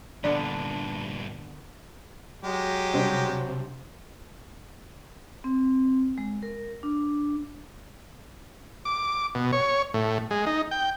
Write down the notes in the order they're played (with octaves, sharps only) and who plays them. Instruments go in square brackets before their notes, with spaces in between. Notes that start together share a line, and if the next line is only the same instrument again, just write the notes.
[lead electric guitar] G2 A#2 [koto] D3 B3 A#4 [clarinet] D4 [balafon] D5
[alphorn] F#3 [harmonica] G#3 G4
[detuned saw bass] C3 [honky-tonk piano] G3 D4 C5
[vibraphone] C4
G#3
A#4
D4
[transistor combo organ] D6
B2
C#5
A2
G#3
D#4
G5